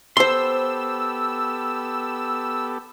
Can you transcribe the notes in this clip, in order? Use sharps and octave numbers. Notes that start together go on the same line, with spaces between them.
B3 G4 A4 C5 C6 E6